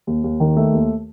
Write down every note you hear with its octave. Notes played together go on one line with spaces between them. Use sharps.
D#2
D#2
D#3
A3
D#2